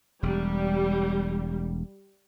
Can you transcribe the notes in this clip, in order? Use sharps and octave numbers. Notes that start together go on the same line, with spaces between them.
E1 G3